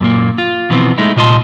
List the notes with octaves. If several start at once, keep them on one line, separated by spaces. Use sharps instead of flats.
F#2 A#2 A#3
F4
B2 E3 F3 A3 B3 C4
G#3 A3 D#4 E4
C2 A#2 F4 D#5 A5 C6